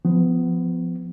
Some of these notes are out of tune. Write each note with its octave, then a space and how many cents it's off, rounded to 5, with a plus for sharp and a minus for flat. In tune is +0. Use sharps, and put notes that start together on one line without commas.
F3 +0 B3 +25